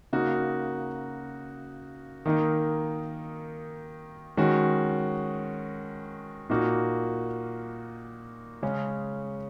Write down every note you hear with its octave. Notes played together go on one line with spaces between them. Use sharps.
C#3 A#3 D#4 F#4
D#3 A#3 D#4
D#3 G#3 C#4 F#4
A#2 A#3 D#4 F#4
C#3 G#3 C#4